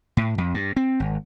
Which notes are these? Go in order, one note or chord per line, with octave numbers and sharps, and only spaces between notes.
A2
F2
G2
C4
G#1